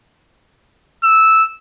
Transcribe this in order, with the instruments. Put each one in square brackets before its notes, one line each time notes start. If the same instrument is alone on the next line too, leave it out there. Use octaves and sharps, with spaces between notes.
[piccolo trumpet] E6